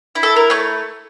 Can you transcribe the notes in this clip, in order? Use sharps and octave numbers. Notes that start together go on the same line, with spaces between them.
E4
A4
A#4
A3 C#5